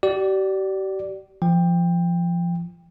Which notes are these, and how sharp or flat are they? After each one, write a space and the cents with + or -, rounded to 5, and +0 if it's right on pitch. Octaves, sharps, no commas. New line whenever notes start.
G4 -40 D5 +0
F3 -20 G5 +15